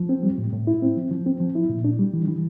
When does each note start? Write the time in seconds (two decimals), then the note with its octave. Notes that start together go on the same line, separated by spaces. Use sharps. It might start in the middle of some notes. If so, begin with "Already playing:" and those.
Already playing: F3
0.09 C4
0.23 G3
0.38 A2
0.53 A2
0.67 E4
0.82 C4
0.96 F3
1.11 F3
1.26 C4
1.40 F3
1.55 E4
1.69 A#2
1.84 D4
1.99 G3
2.14 E3
2.28 E3